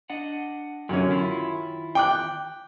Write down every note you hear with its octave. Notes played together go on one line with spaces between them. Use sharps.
D4 D#5 F#5
F#2 D3 C#4
D#3 E4 F4
G5 D6 F#6